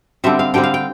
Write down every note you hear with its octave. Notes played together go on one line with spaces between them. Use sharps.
D3 G3 C4 E5
F5
D3 G3 C4 G5
F5
G5